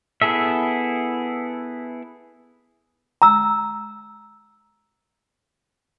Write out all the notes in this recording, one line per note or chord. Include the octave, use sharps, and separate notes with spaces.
B3 E4 G#4 A4 E5
A#5 E6